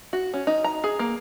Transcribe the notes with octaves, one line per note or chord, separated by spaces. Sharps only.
F#4
C#4
D#4
A#5
G#4
A#3